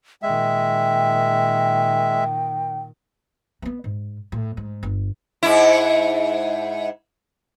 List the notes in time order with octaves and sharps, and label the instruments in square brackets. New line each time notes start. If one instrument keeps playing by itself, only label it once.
[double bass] A#2 D#3 [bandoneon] G#3 E5 [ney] G5
[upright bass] A#3 B3
G#2
A2
G#2
G1
[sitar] G#2 E4